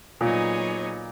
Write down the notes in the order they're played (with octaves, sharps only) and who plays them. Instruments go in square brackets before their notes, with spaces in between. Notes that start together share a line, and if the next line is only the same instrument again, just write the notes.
[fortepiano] A#2 [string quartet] F#3 B3 D#4 G#4 C#5